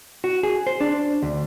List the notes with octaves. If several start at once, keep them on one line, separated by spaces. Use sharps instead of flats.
F#4
G#4
C5
D4
D2